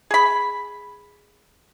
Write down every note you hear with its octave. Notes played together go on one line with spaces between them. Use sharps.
G#4 B5